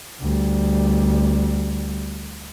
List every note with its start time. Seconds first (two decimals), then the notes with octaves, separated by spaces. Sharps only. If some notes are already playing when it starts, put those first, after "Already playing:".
0.20 D2 G3